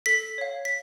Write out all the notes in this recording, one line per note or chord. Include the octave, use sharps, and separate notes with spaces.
A4 B6
C#5 F5
B6